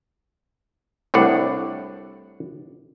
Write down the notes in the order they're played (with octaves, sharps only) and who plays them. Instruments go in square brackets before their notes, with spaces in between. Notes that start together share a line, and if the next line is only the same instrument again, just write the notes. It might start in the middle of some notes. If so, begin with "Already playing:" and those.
[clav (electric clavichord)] C2 A2 D4 F#5